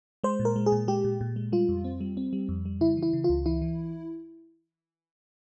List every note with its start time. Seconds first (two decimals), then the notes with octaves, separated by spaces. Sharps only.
0.24 G#3 C5
0.40 A#2
0.45 A#4
0.56 G#3
0.66 G#4
0.72 A#2
0.88 G#3 G4
1.04 A#2
1.21 A#2
1.36 G#3
1.52 G3 F4
1.69 F2
1.84 C4
2.01 G3
2.17 C4
2.33 G3
2.49 F2
2.65 G3
2.81 C#3 E4
2.97 E3
3.03 E4
3.13 C#3
3.24 F4
3.29 C#2
3.46 E3 E4
3.62 E3